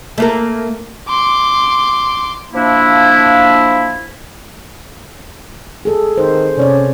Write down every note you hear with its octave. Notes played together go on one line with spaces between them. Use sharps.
A3 A#3 A#4
C6 D6
F3 A#3 D4 E4
G#4 A4
D#3 C5
C3 C#4 C#5 D5